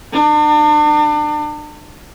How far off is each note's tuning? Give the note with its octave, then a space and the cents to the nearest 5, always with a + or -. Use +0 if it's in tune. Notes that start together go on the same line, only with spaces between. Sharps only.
D4 +40